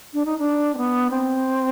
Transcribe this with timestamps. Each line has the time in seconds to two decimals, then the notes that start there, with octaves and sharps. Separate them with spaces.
0.14 D4
0.25 D#4
0.39 D4
0.75 C4
0.78 B3
1.11 C4